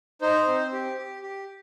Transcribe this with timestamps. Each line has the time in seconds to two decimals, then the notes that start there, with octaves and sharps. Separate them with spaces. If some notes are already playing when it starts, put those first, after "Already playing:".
0.22 D#4 C5
0.47 C4
0.73 G4
0.97 G4
1.22 G4